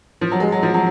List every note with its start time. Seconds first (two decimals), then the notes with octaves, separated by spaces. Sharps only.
0.21 F3
0.31 F#3
0.40 G#3
0.52 F#3
0.63 F3
0.74 F#3